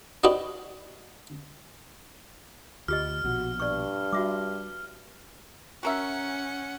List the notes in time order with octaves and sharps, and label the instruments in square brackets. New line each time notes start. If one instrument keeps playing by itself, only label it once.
[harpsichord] D4 F#4 G4 B4 D#5
[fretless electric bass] D2 [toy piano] F4 G4 D#5 [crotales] F6
[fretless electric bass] A#1 B2 [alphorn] F#4
[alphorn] G2 [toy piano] D5 C#6
[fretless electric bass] G3 [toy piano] F#4 E5 D6
[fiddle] C#4 F#5 [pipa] F#4 A#4 E5